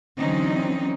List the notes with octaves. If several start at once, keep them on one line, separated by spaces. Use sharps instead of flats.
D3 E3 F#3 C4 C#4 D#4